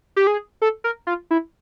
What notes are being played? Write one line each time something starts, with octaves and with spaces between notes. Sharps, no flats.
G4
G#4
A4
A#4
F4
E4